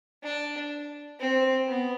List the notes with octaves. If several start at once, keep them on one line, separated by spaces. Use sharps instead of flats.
D4
C4
B3